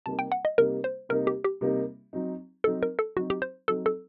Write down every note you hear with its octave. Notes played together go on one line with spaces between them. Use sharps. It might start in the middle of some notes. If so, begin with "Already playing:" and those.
C3 G3 A#3 D#4 A5
G5
F#5
D#5
C3 G3 A#3 D#4 A#4
C5
C3 G3 A#3 D#4 A#4
G4
G4
C3 G3 A#3 D#4
F#3 C4 D#4
F#3 C4 D#4 A4
A#4
A4
F#3 C4 D#4 F#4
G4
C5
F#3 C4 D#4 A4
A4